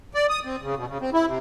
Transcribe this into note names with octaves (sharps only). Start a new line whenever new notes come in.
D5
D#6
C4
C#3
B2
C#3
C4
E4
C3